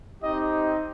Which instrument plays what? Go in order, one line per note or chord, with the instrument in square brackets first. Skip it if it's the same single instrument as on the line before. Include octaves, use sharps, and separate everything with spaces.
[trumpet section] C4 D#4 G4 D#5